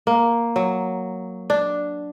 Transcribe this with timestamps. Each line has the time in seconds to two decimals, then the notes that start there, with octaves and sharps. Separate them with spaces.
0.07 A#3
0.56 F#3
1.50 D4